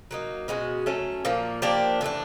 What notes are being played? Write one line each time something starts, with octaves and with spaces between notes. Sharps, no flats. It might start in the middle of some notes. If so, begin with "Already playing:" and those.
F#3 A#3 D#4
B2 G#3 C#4 F#4
F#3 A3 C#4
A#2 F3 A#3
F3 A#3 D4 G4
A2 E3 A3 D4